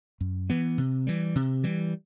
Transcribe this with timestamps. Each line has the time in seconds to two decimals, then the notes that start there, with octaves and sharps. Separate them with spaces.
0.21 F#2
0.50 E3 B3
0.78 C3
1.07 E3 G3
1.35 C3
1.64 E3 G3